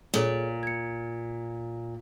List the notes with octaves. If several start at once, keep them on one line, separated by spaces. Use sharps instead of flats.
A#2 G#4 A4 C#5
G#6 C#7